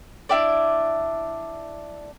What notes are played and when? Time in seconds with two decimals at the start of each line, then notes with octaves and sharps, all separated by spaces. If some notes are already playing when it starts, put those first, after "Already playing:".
0.29 D4 E4 G4 D5